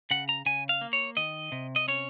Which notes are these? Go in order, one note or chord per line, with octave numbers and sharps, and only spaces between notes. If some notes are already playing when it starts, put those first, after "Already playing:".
C#3 F#5
A#5
C#3 G#5
F5
A#3
C#5
D#3 D#5
C3
D#5
C#4 C#5